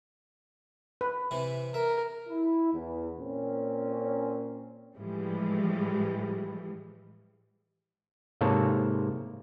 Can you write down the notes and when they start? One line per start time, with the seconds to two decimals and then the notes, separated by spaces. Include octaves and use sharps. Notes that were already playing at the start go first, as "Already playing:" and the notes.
1.01 B4
1.31 C3 E3 E4
1.74 A#4 E5
2.29 E4
2.73 E2
3.18 A#2 C4 C#4
4.96 A2 E3 F3 G3 G#3
8.41 G#2 C3 A#3 A4 C#5 A5